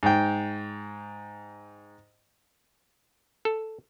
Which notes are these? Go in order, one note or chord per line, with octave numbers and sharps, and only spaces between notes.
G#2 G5
A4